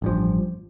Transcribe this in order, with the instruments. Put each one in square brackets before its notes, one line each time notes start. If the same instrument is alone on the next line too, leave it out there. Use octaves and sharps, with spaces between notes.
[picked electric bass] A1 G2 F3